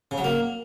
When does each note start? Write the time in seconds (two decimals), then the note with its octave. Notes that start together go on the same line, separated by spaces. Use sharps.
0.11 C#3
0.18 F#3
0.24 A#3